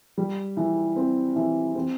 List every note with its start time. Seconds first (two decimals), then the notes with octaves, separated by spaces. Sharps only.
0.18 G3
0.57 E3
0.96 C4
1.36 E3
1.75 C4